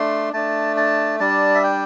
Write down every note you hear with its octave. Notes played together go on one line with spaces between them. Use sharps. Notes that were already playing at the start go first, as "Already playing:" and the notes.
Already playing: A3 D4 C6
A3 D4 A5
A5
G3 D4 A5
E5
G5